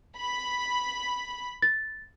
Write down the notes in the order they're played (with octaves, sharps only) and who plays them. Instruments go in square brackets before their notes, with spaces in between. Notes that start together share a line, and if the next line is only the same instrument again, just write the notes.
[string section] B5
[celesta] A6